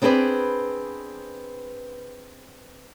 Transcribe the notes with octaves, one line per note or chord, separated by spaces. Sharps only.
B3 C4 D4 G#4 B4 D5